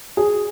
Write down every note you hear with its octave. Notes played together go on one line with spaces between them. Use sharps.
G#4